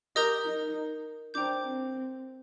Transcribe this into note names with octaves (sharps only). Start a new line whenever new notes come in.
G4 A#4 D#5 A#5 D#6 G6
D#4
D4 C5 G5 A#5 D6 G6
C4